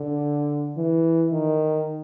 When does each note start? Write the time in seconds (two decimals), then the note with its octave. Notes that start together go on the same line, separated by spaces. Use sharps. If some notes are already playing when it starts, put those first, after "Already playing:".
Already playing: D3
0.77 E3
1.31 D#3